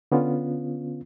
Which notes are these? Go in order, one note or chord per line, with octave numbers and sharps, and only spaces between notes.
D3 B3 C#4 F4